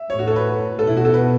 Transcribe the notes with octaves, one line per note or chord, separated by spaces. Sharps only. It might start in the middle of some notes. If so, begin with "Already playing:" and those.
Already playing: E5
A2 C#5
F#4
A4
B4
B2 A4
E4
F#4
A4
B4